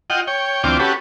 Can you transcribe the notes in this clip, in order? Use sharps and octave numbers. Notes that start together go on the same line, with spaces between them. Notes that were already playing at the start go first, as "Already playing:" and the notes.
F4 D#5 F#5 G5
C#5 G5
D2 E3 C4 F4 G5 D6
C#4 F#4 G4 A4 B4